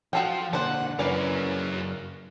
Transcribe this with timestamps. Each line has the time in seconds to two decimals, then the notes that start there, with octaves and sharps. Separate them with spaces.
0.13 F3 F#4 A4 F5 G5
0.53 D3 A#3 D4 C5 F#5
0.99 F#2 C#3 E3 A#4 C#5 D5